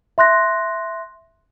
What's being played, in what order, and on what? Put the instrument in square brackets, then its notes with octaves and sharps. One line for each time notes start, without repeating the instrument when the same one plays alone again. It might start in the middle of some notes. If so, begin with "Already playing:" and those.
[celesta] E5 C6 F#6 A#6